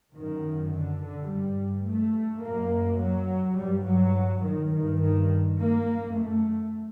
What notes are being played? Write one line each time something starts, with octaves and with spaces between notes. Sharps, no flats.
F#2 D#3
D3
D3
G2 G3
A3
F#2 A#3
F#3
G2 G3
F#3
D#3
G2 D#3
D#3
A#3
F#2
A3